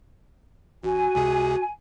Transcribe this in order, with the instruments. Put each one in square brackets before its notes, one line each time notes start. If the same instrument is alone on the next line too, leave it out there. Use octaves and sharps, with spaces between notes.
[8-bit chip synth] A1 [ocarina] F#4 [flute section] G#5
[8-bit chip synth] C#2 C3 G#4